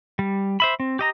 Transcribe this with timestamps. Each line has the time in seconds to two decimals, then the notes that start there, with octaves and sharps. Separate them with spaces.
0.19 G3
0.60 C5 E5 B5
0.80 C4
0.99 G4 D#5 A#5